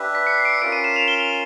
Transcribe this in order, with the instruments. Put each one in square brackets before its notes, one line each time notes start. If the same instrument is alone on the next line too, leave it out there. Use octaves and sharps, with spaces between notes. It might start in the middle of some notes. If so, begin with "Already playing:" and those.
Already playing: [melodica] D4 G4 B4 E5
[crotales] B6
C#7
C7
D7
C#7
[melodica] C#4 F4 A#4 [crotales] D7
[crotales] D#7
E7
F7
G7